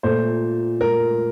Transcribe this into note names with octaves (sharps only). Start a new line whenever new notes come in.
A#2 A3 C5
A#4